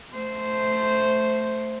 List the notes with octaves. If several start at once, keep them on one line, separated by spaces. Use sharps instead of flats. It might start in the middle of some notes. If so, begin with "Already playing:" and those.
A3 C5